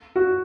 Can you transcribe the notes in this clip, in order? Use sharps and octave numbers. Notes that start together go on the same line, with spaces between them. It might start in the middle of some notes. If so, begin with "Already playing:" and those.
F#4